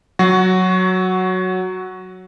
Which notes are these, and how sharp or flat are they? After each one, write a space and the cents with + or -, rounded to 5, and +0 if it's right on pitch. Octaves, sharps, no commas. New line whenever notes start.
F#3 +0 F#4 +0